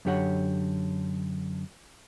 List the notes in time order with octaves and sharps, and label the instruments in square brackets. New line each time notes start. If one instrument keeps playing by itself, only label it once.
[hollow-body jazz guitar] F#2 D3 G4 C#5 F#5